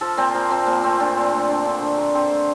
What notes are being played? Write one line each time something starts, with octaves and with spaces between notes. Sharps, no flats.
F3 A4
A#2 C4
F3 A#3
F3 C4
A#2 A#3
A3 C4
A#2 D4
A#2 C4
A3
D3
D3
D3
D3 A#3
D3 C4
A3